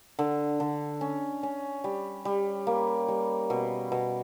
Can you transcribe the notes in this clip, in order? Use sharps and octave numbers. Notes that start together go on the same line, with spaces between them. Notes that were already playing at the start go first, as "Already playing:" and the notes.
D3
D3
C#4
C#4
G3
G3
A#3
G3
B2
B2